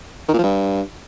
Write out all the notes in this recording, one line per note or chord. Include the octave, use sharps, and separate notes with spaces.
D#3
A#2
F3
G2